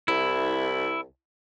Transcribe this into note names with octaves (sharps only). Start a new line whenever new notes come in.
C2 E4